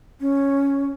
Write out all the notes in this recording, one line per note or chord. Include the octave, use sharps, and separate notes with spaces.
C#4